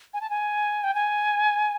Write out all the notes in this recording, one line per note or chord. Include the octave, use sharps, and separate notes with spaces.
G#5
A5
G#5
G5
G#5